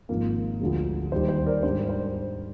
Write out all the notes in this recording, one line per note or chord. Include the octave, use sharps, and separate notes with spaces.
G#1 G#2 F3 A#3 D#4 A#4
D2 D3 F3 G#3
D#2 D#3 G3 C5
C5
A#4 D5
G#2 G3 D4 C5
C5